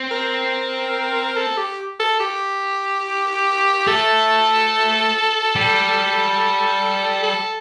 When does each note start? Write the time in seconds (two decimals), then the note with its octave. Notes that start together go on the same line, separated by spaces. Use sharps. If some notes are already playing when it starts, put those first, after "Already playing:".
Already playing: C4
0.11 A#4
1.37 A4
1.57 G4
2.00 A4
2.20 G4
3.87 A3 A4
5.56 G3
7.23 A4